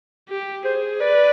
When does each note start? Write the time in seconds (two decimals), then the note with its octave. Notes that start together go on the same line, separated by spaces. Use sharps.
0.29 G4
0.64 G#4 C5
1.00 B4 D5